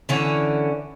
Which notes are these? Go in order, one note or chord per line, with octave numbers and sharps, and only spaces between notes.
D3 E3 C#4